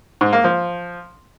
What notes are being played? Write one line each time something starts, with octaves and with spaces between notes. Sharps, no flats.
G#2
A#3
F3